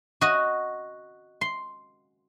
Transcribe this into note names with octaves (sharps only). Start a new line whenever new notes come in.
F#4 D#5
C6